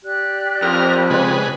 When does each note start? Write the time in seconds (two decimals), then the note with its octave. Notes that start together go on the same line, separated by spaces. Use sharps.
0.04 G4 D5 F#6
0.62 F2 A#4 F6
1.10 C#3 G#3 B4